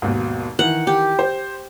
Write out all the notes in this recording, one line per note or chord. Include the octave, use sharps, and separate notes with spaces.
G#1 D#2 B2
D#3 E3 F#5
G4
C5